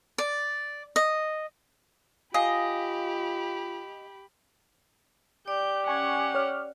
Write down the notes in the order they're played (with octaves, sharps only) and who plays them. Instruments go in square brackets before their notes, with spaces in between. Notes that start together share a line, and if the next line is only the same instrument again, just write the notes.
[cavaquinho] D5
D#5
[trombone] F4 [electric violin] G4 B5 [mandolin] D#5 [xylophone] F5 G#5 C7
[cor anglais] G4 [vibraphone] D5 [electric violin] G6
[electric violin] C#4 F#5 [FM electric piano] G#5 C#6 G#6
[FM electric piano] C#5 F6